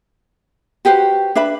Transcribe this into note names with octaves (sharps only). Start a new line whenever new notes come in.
F#4 G4 B4 C5
D4 B4 E5 B5